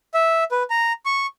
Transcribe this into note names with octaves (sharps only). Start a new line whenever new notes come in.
E5
B4
A#5
C#6